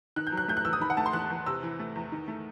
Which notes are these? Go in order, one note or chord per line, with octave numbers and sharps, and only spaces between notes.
D#3 F#6
G6
F#3
F#6
A3 G6
F#6
E2 E6
D#6
D#3 B5
F#5
A3 A5
C6
E2 F#6
E2
C3 E6
E3
A3
E2
D#3
A3